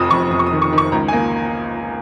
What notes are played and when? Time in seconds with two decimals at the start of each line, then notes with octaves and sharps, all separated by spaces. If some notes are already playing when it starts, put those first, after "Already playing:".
Already playing: F1 F2 D#6
0.11 F2 C#6
0.31 F2 D#6
0.39 C#6
0.46 D#6
0.52 D#3
0.62 C#6
0.73 D#3
0.78 C#6
0.92 C#2 A#5
1.08 G#5
1.13 A#3